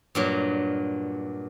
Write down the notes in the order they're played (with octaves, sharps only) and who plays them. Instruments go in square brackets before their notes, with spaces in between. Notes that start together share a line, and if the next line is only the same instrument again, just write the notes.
[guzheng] G2 A#2 F#3